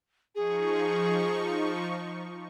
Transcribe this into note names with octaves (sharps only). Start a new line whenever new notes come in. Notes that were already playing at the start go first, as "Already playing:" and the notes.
F3 D#4 G#4 C#6